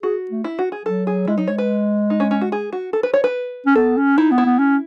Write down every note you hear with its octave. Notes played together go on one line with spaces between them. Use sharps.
F#4 G#4
A3
E4
F#4
G#4
F#3 A4
G#4
G#3 E4
F#3 D#4
G#3 C#5
B4
D#4
C#4
C#4
F#4
G#4
F#4
A4
B4
C#5
B4
C#4
B3 A4
C#4
D#4 E4
B3
E4
B3
C#4